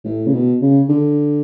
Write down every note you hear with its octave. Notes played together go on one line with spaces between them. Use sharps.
A2
C#3
B2
C#3
D3